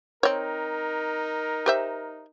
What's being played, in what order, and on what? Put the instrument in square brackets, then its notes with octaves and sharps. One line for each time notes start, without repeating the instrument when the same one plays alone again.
[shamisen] C4 C#5 [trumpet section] D#4 A#4
[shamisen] G4 C5 E5